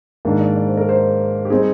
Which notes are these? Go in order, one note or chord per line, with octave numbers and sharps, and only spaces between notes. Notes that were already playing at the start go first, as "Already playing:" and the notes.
G#2 D#3 A#3 D4
D5
D5
C5
A#4
C5
G4
G3 C4 D#4 G#4